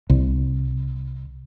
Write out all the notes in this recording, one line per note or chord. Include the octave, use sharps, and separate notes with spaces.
C2